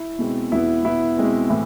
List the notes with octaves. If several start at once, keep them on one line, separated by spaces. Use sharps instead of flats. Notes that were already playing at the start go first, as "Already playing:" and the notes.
Already playing: E4
B2 G#3 C4
E2 B2 B3 E4
B2 B3 E4
B2 G#3 C4
A2 E3